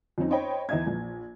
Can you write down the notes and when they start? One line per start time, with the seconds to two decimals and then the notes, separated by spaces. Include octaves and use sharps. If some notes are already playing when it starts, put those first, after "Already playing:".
0.18 F2 C4 C#4 D#4
0.30 C5 C#5 D#5 G5 B5
0.69 E2 E4 D#5 E5 G#6
0.87 A#1